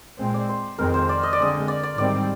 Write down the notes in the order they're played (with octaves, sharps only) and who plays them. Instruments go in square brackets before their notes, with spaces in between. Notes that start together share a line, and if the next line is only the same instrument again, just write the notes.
[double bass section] A#2 G#3 C4
[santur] D5
C5
[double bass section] F2 D#3 G#3 C4 [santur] A#4
[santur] C5
D5
D#5
D5
[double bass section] D3 G#3 C4 [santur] D#5
[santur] D5
D5
[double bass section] G#2 D#3 G3 C4 [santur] D5